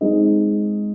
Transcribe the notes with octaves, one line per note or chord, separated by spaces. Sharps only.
G#3 C4 D#4 G#4 D#5